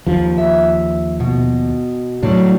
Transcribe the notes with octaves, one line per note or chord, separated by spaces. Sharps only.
D#2 F3
E5
B2
A2 F#3 G3 D4